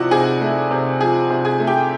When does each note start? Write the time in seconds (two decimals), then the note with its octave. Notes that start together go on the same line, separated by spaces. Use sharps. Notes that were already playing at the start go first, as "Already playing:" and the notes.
Already playing: C3 F3 D#4 E4 F#4 D5 D#5 F#5
0.11 C3 G#4 G#5
0.41 A3
0.71 C3
1.01 F3 G#4 G#5
1.31 C3
1.45 G#4 G#5
1.60 A3
1.67 G4 G5